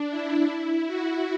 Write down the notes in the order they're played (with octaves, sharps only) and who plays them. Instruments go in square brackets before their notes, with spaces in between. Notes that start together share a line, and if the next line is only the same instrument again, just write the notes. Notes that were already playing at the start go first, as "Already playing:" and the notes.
Already playing: [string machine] D4
E4
F#4